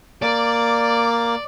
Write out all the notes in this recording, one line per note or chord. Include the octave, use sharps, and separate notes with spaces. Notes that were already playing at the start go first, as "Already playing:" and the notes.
A#3 D5